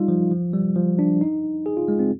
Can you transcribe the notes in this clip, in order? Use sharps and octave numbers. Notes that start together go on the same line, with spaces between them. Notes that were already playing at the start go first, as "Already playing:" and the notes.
Already playing: G3 D#4 F4
F3
F3
G3
F3
D4
D#4
G#4
F4
G#3
C4